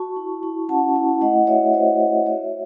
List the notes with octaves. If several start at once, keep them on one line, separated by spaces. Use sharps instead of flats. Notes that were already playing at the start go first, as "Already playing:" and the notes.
Already playing: F#4 A5 C#6
E4
E4
C#4 F#5 A5
E4
A3 D#5 F#5
F#4 C#5 E5
F#4 C5 D#5
F#4
F#4 C#5 E5